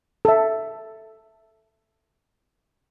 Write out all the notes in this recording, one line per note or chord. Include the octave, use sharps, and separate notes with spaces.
A4 E5